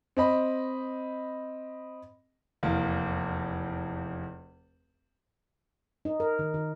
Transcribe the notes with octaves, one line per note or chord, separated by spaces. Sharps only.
C4 D#5 B5
F1 E2 A#3
D#4
A#4
D#3
D#3